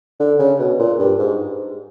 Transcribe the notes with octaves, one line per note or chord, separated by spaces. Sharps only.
D3
C#3
B2
A#2
G2
G#2